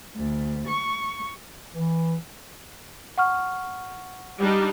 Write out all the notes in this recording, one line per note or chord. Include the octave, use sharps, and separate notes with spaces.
D2
C#6
E3
F#5 C#6 F6
G3 D4 D#4